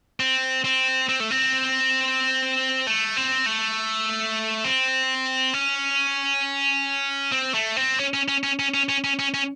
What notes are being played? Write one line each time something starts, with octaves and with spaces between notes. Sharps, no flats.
C4
C4
C4
A3
C4
A3
C4
A3
C4
C#4
C4
A3
C4
C#4
C#4
C#4
C#4
C#4
C#4
C#4
C#4
C#4
C#4